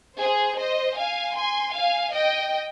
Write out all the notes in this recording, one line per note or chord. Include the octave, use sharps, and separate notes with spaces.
G#4 C5
C5 D#5
F5 G#5
G#5 C6
F5 G#5
D#5 G5